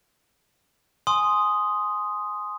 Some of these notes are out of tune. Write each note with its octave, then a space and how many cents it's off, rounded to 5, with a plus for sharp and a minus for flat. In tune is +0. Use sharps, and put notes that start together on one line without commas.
G#5 +10 C6 +0 D#6 +0